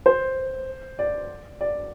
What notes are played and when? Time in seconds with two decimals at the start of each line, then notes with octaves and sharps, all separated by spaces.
0.06 C5
0.99 D5
1.61 D5